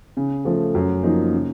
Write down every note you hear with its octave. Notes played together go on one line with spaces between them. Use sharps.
C#3
F3 A3
F#2
F3 A#3 D#4
C#3